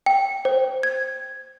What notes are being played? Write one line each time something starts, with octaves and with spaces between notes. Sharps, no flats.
G5
C5
G#6